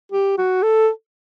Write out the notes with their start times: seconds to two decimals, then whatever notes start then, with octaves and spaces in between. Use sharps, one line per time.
0.12 G4
0.38 F#4
0.62 A4